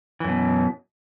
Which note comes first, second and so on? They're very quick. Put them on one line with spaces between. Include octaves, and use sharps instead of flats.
E3 F#2 B2